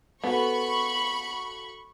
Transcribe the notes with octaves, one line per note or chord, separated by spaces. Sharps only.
B3 F#4 A4 C5 B5 C#6